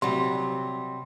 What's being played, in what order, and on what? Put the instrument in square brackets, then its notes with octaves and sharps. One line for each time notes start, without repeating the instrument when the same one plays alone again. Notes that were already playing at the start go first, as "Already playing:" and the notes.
[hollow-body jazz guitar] C3 F#3 G3 [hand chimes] C6